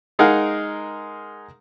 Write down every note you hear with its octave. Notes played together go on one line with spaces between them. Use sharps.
G#3 D#4 G#4 A#4 F5 F#5